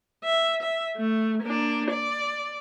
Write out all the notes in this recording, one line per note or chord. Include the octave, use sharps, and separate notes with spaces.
E5
E5
A3
A#3 D4
D5